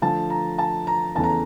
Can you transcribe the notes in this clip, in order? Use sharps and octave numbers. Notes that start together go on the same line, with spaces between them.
D3 F3 A3 A5
A#5
A5
A#5
E2 C#3 E3 A3 A5
A#5